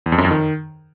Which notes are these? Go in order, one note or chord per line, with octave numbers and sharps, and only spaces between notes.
E2
F2
F#2
F2
D#3